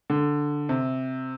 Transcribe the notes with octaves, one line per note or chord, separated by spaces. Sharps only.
D3
C3